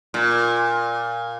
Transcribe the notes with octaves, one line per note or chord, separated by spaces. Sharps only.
A#2